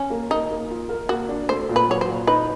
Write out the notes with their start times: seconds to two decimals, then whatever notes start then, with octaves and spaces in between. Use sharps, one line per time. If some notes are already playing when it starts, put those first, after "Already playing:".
Already playing: C#4
0.10 A#3
0.30 A#3 D#4
0.50 A#3
0.70 F4
0.89 A#4
1.09 A#3 F#4
1.29 D4
1.49 A3 C5
1.69 A#2
1.76 B4
1.89 F#3 C#5
2.01 C5
2.08 A#2
2.27 D#4 B4